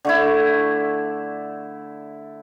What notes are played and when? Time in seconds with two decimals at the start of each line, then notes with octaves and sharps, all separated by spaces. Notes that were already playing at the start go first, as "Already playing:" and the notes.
0.05 D3 A3 E4